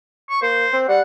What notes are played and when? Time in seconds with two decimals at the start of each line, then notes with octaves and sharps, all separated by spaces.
0.30 C#6
0.42 A#3 C5
0.73 C4
0.89 G3 F#5